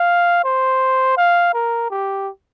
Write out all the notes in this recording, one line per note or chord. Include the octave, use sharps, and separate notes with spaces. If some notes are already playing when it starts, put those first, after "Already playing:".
Already playing: F5
C5
F5
A#4
G4